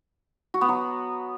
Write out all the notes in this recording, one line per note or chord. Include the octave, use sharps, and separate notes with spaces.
F#4
B3
F#3